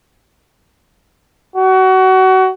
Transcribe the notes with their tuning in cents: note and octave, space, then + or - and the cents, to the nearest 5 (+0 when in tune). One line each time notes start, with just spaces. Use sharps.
F#4 +25